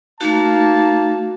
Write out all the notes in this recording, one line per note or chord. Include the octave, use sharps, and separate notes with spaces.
A3 A#3 D#4 F#4 A5